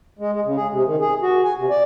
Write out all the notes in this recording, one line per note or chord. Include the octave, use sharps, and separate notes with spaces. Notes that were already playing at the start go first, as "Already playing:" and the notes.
G#3
G#3
C#3
G#4
C3
D#3
G#4
F#4
G#5
C3
D5